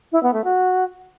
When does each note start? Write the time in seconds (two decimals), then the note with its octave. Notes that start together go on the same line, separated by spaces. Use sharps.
0.12 E4
0.23 B3
0.33 A3
0.44 F#4